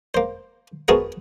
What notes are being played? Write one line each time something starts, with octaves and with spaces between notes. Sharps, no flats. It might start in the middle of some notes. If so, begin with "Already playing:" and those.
A#3 C5
A3 B3 C4 F#4 G#4 A#4